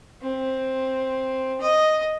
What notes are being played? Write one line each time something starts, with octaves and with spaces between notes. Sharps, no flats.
C4
D#5